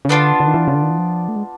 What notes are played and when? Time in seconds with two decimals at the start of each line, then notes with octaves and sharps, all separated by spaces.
0.05 C#3
0.09 D3 B3 D4 F4
0.40 D3
0.47 D#3
0.54 E3
0.68 C#3
0.75 D3
0.83 D#3
0.90 E3
0.98 F3
1.28 A3
1.36 G#3